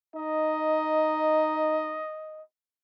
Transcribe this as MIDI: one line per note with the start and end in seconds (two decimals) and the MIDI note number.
0.16 2.02 63
0.16 2.42 75